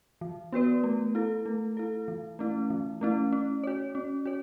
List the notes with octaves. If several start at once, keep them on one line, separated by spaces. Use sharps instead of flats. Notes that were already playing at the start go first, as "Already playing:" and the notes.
E3
B3 F#4 B4 D5
A3
E4 A4
A3
E4 A4
E3
A3 C#4 E4
E3
A3 C#4 E4
C#4
F#4 C#5
C#4
F#4 C#5